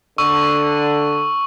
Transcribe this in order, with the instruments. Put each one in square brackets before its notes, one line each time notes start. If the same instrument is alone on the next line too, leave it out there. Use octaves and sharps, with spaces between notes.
[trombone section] D3 [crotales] C#6 E6